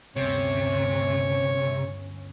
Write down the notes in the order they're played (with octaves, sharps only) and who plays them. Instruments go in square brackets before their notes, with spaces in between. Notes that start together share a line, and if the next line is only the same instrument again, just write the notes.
[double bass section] G1 D2 C#4 [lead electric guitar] C3 [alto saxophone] C#5